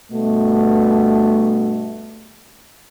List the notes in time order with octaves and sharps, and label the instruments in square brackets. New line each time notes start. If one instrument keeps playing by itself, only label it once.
[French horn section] G2 B2 A3